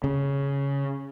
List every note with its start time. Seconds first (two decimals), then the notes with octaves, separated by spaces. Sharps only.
0.04 C#3